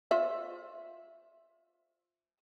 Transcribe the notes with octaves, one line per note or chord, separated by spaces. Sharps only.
F4 C5 E5